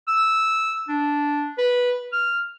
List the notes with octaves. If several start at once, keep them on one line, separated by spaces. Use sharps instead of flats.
E6
D4
B4
F6